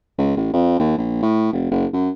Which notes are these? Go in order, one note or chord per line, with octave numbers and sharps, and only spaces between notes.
C#2
A1
F2
D#2
A#1
A2
F1
F#1
F#2